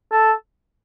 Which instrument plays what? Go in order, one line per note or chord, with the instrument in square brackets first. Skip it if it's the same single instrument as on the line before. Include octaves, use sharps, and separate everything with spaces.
[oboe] A4